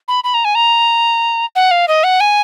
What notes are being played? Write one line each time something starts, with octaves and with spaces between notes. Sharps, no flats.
B5
B5
A#5
G#5
A#5
F#5
F5
D#5
F#5
G#5